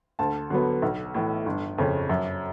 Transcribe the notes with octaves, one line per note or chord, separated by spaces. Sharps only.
D2 A5
D3 F#3 B3
B1
A2 E3
G1
F2 C#3
F#2